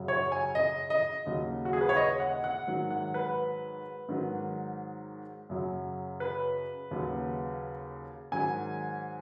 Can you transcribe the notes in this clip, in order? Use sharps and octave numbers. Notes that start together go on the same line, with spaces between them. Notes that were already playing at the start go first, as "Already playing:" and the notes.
Already playing: F#2 C#3 F#3
C#5
G#5
D#5
D#5
D#2 C#3 F#3
F#4
G#4
B4
C#5
D#5
F#5
F#5
G#2 D#3 F#3
F#5
B4
G#2 D#3 F#3
F#2 C#3 F#3
B4
D#2 C#3 F#3
G#2 D#3 F#3 G#5